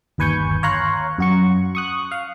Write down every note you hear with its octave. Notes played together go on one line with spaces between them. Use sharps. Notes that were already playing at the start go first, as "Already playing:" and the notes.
G1 D#2 B4 G#5 C#6 G6
C#5 F5 A#5 C6 F#6
F#2 F#4 C#6
C#6 D#6 F#6
F5